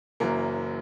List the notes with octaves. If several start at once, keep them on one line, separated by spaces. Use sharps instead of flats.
F#1 F#2 E3 F#3 A#3